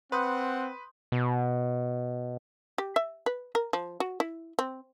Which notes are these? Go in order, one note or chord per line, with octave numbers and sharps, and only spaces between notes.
C4 B4 F#5 C6 D#6 G6
B2
G4
E5
B4
A#4
F3
F#4
E4
C4